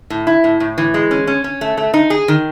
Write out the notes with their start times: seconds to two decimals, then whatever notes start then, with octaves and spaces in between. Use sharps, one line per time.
0.10 A2
0.27 E4
0.44 A2
0.60 A2
0.78 E3
0.94 G#3
1.11 C#4
1.27 C#4
1.44 C#4
1.61 A3
1.77 A3
1.94 D#4
2.10 G#4
2.28 D#3